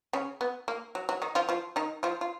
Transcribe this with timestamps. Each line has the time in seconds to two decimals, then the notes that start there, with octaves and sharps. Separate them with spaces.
0.13 C#3 C#4
0.41 B3
0.68 A#3
0.95 F#3
1.09 F#3
1.22 D#3 D#4
1.35 F3 F4
1.49 F3 F4
1.76 D#3 D#4
2.03 F3 F4
2.21 F4